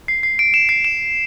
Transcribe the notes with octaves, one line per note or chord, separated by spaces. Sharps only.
C7
C7
D7
E7
C7
E7